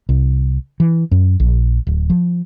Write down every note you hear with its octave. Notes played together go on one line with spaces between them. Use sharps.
C2
E3
F#2
A#1
D1
F3